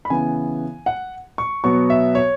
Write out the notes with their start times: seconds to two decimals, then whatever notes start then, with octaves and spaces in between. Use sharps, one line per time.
0.05 B5
0.10 C#3 E3 B3 G#5
0.86 F#5
1.38 C#6
1.64 B2 F#3 B3 C#6
1.90 E5
2.15 C#5